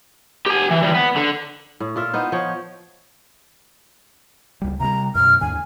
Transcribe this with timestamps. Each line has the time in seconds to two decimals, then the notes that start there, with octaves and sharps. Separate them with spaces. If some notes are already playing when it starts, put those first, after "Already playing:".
0.46 G4 G#5
0.70 E3
0.82 E3 G3
0.94 B3
1.16 D3
1.80 A2
1.96 A#2 F4 E5
2.13 B3 D#4 C5
2.32 F3 C#5
4.62 C#2 G3
4.80 C3 F#3 G3 A#5
5.15 F#2 B2 F6
5.41 D#2 G#2 D3 G#5